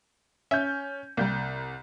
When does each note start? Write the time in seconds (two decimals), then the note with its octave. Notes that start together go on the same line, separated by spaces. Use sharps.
0.51 C#4 E5 G6
1.17 C2 G3 A#3 G6